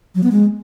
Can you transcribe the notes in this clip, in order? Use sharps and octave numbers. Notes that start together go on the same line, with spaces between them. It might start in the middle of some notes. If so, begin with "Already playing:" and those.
F#3
B3
G#3